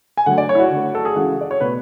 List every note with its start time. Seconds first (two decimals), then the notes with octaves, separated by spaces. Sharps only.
0.17 G#5
0.26 D3 F#3 A3 F#5
0.38 D5
0.49 C#5
0.55 E4
0.59 F#4
0.71 D3 A3
0.95 A4
1.05 G#4
1.15 C#3 E3 G#3 F#4
1.41 D5
1.51 C#5
1.61 B2 A3 B4